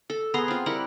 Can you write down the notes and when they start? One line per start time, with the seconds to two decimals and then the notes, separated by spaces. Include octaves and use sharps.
0.10 A4
0.34 B3 G#4 A#5 C6
0.48 C4 F4
0.66 G3 E4 A#4 F#5